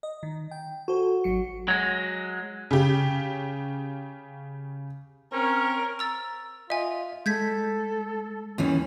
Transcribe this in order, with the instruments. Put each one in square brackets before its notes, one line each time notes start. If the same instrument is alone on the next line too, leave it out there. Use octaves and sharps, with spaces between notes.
[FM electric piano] D#5
D#3
G5
[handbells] F#4 [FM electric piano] A4 C5
[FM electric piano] G#1 F#3 C#7
[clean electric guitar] F#3 G#3
[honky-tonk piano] C#3 G4
[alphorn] C4 [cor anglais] C#4 [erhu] A#4
[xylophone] A#5 E6 A6
[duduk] F4 [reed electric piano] D#5 [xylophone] E5 G#5
[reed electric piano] G#3 [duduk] A4 [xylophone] G6 G#6 B6
[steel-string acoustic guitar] D#2 E3 C#4 [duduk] D#3